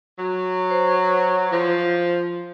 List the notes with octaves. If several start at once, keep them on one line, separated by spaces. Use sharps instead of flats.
F#3
C5
F3